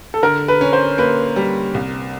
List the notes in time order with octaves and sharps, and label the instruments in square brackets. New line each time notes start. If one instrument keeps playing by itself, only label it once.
[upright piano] A4
[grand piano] D3 [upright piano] A#4
[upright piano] B4
[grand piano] C#4
[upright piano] C5
[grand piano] A#3 [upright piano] B4
[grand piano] G3
C2